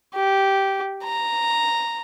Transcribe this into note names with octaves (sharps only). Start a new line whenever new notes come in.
G4
A#5